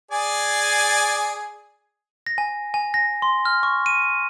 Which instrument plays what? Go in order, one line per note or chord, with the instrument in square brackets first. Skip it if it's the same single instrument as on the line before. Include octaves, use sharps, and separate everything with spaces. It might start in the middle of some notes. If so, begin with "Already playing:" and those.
[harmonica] G#4 D5 G#5
[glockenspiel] A#6
G#5
G#5
A#6
C6
F6
C#6
D#7